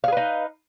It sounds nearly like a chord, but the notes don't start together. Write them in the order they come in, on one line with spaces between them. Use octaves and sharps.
F5 G#4 B4 D#4